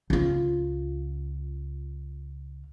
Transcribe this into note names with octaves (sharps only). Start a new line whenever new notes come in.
C#2 F4